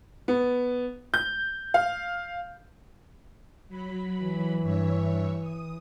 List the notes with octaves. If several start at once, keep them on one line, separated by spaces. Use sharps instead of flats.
B3
G6
F5
F#3 B5
E3
G2 C#5 E5
D#6